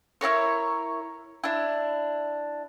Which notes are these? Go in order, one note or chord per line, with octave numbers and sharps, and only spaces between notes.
E4 F4 A#4 C#5
D4 E4